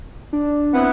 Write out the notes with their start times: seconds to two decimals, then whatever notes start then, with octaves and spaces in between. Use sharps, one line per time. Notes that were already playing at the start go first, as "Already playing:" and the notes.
0.33 D4
0.73 B3 C4 E4 B4 F#5